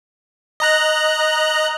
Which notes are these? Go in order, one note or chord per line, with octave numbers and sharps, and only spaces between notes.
D#5 A#5 F#6